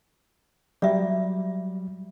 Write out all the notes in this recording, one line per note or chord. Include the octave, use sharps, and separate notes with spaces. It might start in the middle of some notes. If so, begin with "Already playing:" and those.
F#3 G3 D5 E5